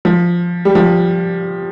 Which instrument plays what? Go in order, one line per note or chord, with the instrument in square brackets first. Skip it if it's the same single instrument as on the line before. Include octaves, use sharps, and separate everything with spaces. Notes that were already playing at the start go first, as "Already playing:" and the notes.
[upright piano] F3
G3
F3